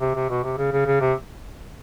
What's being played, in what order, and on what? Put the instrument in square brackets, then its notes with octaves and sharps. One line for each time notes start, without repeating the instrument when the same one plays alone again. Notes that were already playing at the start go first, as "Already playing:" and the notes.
[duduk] C3
C3
B2
C3
C#3
C#3
C#3
C3